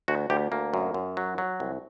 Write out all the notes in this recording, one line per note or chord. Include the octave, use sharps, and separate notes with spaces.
D2 F#4
D2 G4
D2 A#3
F#2
F#2
F#3
F#3
C2